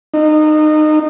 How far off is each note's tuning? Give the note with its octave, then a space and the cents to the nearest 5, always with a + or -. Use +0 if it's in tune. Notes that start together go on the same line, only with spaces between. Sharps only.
D#4 -25